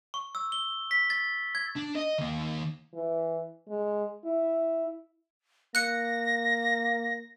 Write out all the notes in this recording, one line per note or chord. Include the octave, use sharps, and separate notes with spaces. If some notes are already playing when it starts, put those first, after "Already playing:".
C#6
E6
G7
B6
A6
G#6
D4
D#5
D#3 A#3
E3
G#3
E4
A#3 F#6 A#6 C#7